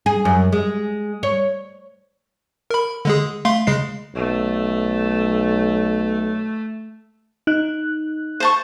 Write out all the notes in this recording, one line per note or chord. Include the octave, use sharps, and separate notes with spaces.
G#4
F#2
G#3
C#5
A#4 B5
D3 G#3 G#4
A3 F5 C6
C#3 G#3 C7
B1 A3
D#4 F#6
C5 A5 C#6